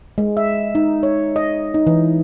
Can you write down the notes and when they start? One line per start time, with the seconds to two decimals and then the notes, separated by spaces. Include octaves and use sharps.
0.18 G#3
0.37 E5
0.75 D#4
1.03 C#5
1.36 D#5
1.74 D#4
1.87 E3